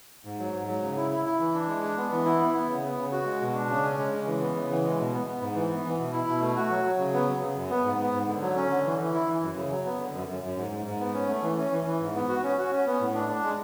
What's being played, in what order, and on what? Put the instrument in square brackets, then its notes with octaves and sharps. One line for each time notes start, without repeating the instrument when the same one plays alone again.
[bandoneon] G#2
F#3
G#2
F#3
C#3
E4
E4
E4
E3
D4
G#3
D4
B3
E3
E4
B3
B3
C#3
B3
C#3
F#4
G#3
B2
D4
C#3
C#4
G#3
C#3
E3
B3
C#3
E3
G#3
B2
B3
B3
G#2
E3
B3
E3
B2
E4
B2
A3
F#4
F#3
F#3
C#3
B3
F#3
C#3
F#2
B3
G#2
B3
G#2
D3
F#3
C#4
D3
E3
E3
E4
E3
F#2
C#3
F#3
B3
D3
F#2
F#2
F#2
G#2
G#2
G#2
B3
C#4
A3
E3
C#4
E3
E3
G#2
B3
F#4
C#4
F#4
C#4
B3
A2
D4
D4
G#3